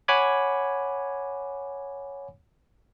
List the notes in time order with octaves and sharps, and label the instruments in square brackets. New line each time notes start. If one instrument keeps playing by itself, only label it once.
[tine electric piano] C#5 F#5 G#5 B5 D6 G#6